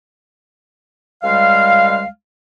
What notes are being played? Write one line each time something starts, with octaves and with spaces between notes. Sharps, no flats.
C#2 G3 G#3 F5